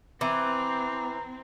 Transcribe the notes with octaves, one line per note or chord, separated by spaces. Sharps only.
E3 C4 A#5 D6